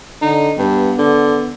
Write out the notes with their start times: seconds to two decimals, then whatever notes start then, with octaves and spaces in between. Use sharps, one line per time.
0.22 D3 D#4
0.58 G2 B3
0.98 D3